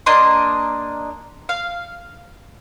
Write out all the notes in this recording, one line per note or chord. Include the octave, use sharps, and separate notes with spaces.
A#3 D4 D#5 C6
F5